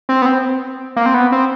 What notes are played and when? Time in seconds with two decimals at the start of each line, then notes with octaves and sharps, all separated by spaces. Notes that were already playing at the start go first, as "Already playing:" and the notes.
0.09 C4
0.22 B3
0.26 C4
0.96 A#3
1.06 C4
1.14 B3
1.32 C4